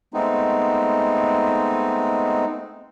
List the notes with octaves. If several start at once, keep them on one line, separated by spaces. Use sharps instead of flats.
G#3 A3 B3 C4 D#4